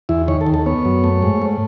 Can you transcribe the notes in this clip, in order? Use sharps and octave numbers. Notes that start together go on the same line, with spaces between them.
E2 E4
D#3 C#5
A4
D#2
A4
B3 C#5
F#2
A3
G#2
A3